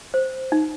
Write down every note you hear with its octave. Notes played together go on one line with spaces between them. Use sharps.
C5
D#4